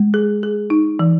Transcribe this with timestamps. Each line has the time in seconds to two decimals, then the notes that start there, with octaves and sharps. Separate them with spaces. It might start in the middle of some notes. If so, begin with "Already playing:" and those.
Already playing: G#3
0.14 G#4
0.43 G#4
0.70 D#4
0.99 E3